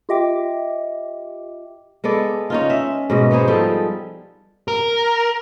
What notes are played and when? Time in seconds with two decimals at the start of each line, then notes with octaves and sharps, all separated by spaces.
0.09 F4 G4 D#5 E5 G5 D6
2.04 G#3 B3 A4 D5
2.50 C#4 D#4 F4
2.70 E5
3.10 G#2 B2 D#5
3.31 B3 D#4 G#4 C5
3.47 F3 G3 G#4 A4
4.68 A#4